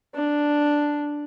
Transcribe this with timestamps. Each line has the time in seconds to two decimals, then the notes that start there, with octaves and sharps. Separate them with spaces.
0.15 D4